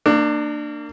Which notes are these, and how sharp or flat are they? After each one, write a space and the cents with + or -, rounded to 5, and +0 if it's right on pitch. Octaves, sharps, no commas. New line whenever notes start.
A#3 -30 D4 +20